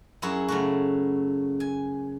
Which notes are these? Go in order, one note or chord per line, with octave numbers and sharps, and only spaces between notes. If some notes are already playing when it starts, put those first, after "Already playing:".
F#2 E4 F#4 G#4
C#3 A3 F#4
G#5